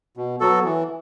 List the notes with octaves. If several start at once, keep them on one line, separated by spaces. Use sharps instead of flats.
B2
F#3 B3 F#4 A4
E3